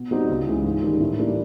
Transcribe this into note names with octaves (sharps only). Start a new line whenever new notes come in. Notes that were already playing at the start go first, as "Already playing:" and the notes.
Already playing: B2
G3 C4 D#4 F#4
C#2
C#3 E3 G#3
G#2
D#3 G3
A2
E3 G3 A#3 D4